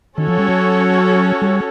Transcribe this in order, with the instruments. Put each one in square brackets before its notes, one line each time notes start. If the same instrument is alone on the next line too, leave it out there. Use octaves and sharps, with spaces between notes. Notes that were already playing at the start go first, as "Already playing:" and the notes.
[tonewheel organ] D#3 [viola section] C#4 F#4 A4 C#5
[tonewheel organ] F3
G3
F#3
G3